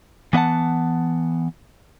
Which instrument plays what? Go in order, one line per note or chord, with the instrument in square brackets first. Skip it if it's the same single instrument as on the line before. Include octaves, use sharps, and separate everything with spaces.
[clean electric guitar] E3 B3 E5 F#5 A5